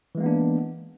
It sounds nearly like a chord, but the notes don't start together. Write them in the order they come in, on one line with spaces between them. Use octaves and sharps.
E3 G#3 A#3 B3 D4